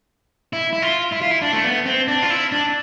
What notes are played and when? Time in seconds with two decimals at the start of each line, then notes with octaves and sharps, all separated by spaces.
0.53 E4
0.73 E4
0.82 F4
1.12 E4
1.21 F4
1.31 E4
1.42 D4
1.53 A3
1.64 B3
1.86 C4
2.08 D4
2.23 F4
2.30 E4
2.52 D4